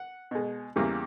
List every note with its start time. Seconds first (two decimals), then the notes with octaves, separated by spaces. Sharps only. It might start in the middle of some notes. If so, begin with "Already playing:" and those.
Already playing: F#5
0.31 B2 G#3
0.76 E2 C#3 E3 G3 A#3